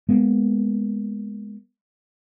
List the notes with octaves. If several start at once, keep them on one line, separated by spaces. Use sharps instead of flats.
G#3 A#3 B3